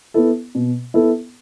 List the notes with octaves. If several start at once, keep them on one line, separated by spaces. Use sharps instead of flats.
B3 E4 A4
B2
B3 E4 A4